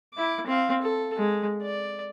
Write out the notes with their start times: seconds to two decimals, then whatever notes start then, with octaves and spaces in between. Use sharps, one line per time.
0.14 E4 D6
0.46 C4 F5
0.82 A4
1.17 G#3
1.62 D5